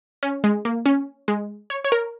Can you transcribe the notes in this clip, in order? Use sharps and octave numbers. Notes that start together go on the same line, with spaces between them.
C#4
G#3
A#3
C#4
G#3
C#5
C#5
A#4